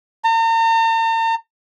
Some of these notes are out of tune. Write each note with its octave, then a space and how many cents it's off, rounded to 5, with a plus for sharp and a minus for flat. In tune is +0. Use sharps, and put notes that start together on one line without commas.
A#5 -45